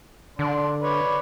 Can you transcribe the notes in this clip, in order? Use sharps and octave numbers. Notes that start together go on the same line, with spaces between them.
D3 D4 C6
B4 C#5 D5